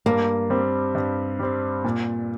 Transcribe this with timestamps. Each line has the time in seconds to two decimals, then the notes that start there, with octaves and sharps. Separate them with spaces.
0.06 G2 A#3
0.50 G3 C4
0.95 G2
1.39 G3 C4
1.84 A#2